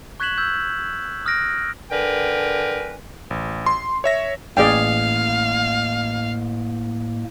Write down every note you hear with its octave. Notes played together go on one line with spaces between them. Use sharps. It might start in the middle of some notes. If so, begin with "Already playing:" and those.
C#6 F#6 G#6 B6 E7 F#7
E6 F#6 G6
D#6 F6 F#6 A#6 D7
D3 A#4 B4 G5 G#5
A1
C6
C#5 E5 A#6
A1 A2 A#3 G#4 D5 F5 G5